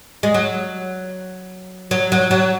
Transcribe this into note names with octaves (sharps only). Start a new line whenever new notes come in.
G#3
F#3
F#3
F#3
F#3